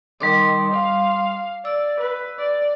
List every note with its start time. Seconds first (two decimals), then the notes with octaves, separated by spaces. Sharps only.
0.20 D#3 G3 C6 D6
0.74 F5
1.65 D5 E6
2.00 B4
2.39 D5